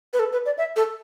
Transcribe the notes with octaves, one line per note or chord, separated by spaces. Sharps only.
B4
A4
B4
D5
E5
A4